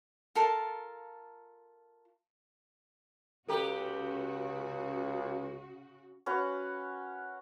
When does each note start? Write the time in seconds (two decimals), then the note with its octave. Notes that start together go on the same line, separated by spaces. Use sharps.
0.35 F4 A4 A#4 A5
3.48 C#2 C#3 B3 F#4 G4 A4 B4 A#5
6.26 C#4 F#4 B4 F5